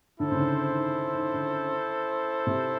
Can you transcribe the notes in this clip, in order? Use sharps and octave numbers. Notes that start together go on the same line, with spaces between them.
D3 E4 A4 C5
C#3
D3
D#3
D#3
D#3
D3
C3